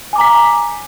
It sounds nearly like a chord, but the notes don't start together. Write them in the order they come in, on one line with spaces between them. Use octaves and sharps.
G#5 D6 A#5 B6